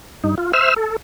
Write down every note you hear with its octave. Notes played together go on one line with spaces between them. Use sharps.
G2 D#4
F4
C5 E5 E6 F6
A4